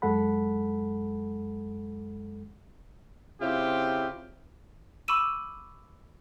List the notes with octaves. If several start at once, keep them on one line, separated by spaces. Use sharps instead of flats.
F#2 G#3 A4 F#5 B5
C#3 C4 E4 F4 G4
B5 C#6 D6 E6 D#7 E7